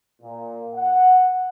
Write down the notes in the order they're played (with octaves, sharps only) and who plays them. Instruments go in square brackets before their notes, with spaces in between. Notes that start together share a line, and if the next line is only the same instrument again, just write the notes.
[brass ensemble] A#2
F#5